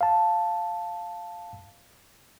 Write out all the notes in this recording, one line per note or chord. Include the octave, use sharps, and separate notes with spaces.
F5 A5